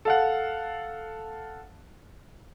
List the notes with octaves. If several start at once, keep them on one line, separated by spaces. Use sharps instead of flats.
A4 F5 F#5